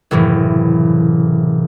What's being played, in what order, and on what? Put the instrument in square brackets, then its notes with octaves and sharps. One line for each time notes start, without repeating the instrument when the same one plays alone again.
[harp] F#1 A2 C3 E3